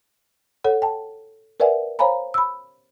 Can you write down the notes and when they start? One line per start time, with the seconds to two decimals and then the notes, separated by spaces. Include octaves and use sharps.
0.64 A4 C#5 F#5
0.82 G5 A5
1.60 A#4 B4 D5 E5 F#5 G#5
1.99 C5 C#5 F5 G#5 A#5 B5
2.34 B5 E6